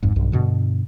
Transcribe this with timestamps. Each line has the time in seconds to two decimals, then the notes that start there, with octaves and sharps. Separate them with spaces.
0.03 G#1 F2 G#2
0.16 B1 G2
0.32 G2 B2 D3